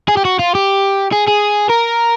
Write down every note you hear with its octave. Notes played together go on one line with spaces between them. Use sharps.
G#4
G4
F#4
F4
G4
G#4
G#4
A#4